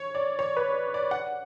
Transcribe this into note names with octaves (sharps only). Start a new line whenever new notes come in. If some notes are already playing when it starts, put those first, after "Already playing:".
Already playing: C#5
D5
C#5
B4
D5
F#5